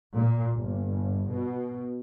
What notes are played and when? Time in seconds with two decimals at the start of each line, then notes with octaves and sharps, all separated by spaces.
0.14 A#2
0.53 G1
1.30 B2